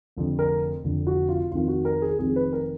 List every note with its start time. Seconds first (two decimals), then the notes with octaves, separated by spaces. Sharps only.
0.16 F1 F2 D3
0.39 A#4
0.84 F1 F2 D3
1.07 F#4
1.29 F4
1.51 F1 F2 D#3 F4
1.68 F#4
1.85 A#4
2.02 G#4
2.19 F1 F2 D#3 G#4
2.36 B4
2.53 A#4